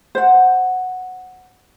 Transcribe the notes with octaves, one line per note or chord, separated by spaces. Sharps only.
C5 F#5